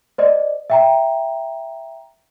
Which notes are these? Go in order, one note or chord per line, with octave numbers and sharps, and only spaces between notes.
C5 D5 D#5
E5 G5 A#5